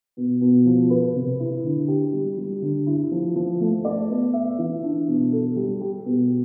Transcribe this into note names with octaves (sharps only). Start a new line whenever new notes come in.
B2
B2
F3
B4
C3
E4
D3
G4
G3
G3
D3
E4
F3
F3
A3
D5
B3
E5
E3
D4
B2
A4
G3
G4
B2